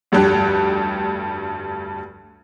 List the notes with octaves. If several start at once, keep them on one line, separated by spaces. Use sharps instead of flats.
F1 D2 G2 G4 F#6